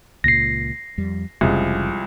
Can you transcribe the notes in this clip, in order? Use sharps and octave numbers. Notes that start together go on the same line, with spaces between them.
C#2 A#2 A#6 C7
F2 G3
F1 C2 C#3 F3 G#3